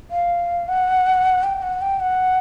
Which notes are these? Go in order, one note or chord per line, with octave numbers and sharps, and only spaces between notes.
F5
F#5
G5
F#5
G5
F#5